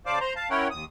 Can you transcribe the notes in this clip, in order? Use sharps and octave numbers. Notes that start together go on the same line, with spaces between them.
C#3 C5 D5 F5 A5 D6
C5 A#5 C6
F5 A5
C#4 E4 A#4 C#5 F#5 G5
D#2 D#6